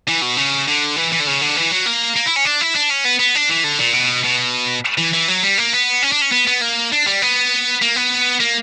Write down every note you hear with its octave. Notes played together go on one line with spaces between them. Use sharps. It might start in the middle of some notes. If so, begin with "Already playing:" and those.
E3
B2
C#3
D3
E3
E3
D3
C#3
D3
E3
F#3
A#3
A#3
E4
C#4
D4
E4
D4
C#4
B3
B3
D4
E3
D3
A#2
B2
B2
E3
E3
F#3
G3
A#3
B3
C#4
D4
C#4
B3
B3
A#3
D4
G3
B3
A#3
B3
A#3